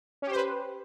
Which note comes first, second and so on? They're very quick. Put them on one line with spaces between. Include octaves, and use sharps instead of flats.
C#4 G4 C5 B4